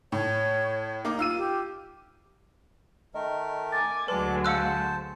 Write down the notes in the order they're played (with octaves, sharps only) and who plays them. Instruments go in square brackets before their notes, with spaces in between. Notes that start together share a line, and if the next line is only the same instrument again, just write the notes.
[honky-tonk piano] A2 [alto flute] C#5
[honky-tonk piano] A#3 D#4 D6
F4 E6 D#7
[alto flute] G4
[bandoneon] D#3 A3 A#4 [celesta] D#5
[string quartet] G#5 D6 [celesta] A6
[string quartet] D2 F#3 G#3 [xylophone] B4 [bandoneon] D5 A5 D6
[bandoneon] C5 A5 [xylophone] F5 E6 F#6 [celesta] C6 C#7